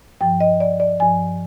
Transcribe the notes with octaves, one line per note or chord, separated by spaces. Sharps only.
G2 F3 G5
D#5
D5
D5
G2 F3 G#5